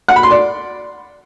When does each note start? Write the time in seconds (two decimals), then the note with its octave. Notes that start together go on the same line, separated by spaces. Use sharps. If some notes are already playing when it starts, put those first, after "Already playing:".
0.08 F#5
0.16 B5
0.23 C6
0.31 D5